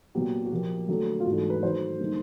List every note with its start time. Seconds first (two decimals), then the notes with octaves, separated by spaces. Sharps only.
0.15 A#2 F#3 B3 G4
0.44 F#4
0.51 A#2 F3 A#3 G4
0.88 D3 F#3 A3 D4
1.20 F4
1.26 G#2 E3 A3 D4 F#4
1.50 B4
1.63 D#3 F#3 A3 C5
2.00 D3 G3 A#3 D#4